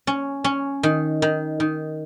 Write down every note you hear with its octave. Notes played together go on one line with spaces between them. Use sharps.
C#4
C#4
D#3
D#3
D#3